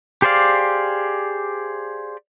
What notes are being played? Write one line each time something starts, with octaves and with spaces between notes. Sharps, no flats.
G4 G#4 C5 D5 F5